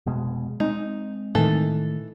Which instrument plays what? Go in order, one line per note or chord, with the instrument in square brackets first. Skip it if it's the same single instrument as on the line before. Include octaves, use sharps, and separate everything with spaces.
[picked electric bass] F1 B2 G#3
[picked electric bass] G#3 C4 [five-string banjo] D#4
[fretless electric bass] A2 D#3 [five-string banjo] E3 A4